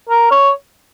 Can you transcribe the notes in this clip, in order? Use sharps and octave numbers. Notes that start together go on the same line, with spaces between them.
A#4
C#5